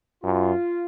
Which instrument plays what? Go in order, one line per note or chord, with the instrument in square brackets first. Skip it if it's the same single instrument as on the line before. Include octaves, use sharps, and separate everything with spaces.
[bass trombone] F#2 [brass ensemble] F4